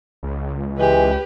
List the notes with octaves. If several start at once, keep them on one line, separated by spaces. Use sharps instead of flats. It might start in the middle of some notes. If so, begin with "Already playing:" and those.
C#2
E3 G#3 G4 B4